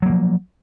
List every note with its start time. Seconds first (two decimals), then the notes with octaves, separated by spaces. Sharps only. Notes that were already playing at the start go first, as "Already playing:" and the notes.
0.02 F#3
0.06 A#3
0.09 F3